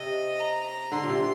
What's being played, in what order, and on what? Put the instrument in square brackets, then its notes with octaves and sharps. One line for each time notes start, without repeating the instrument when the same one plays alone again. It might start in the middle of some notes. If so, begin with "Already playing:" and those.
Already playing: [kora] C3 [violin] D#5
[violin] A#5
[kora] D3 [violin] C6
[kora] A#2
C3